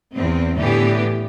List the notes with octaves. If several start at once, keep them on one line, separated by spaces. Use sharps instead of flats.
E2 C4
A2 D3 E3 B3 G4